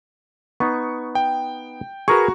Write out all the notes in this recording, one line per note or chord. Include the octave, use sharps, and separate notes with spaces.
B3 D#4 C#6
G5
F#4 G#4 A#4 B4 A#5 C#6